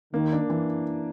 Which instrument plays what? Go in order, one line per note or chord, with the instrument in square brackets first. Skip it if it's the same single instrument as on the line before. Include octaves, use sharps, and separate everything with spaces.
[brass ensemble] D#3 [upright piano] A#3
[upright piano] D4
E3